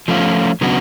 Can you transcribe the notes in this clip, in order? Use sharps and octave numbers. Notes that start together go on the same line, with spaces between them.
F3 A3 C#4 F4
C#3 F#3 B3 D4 F#4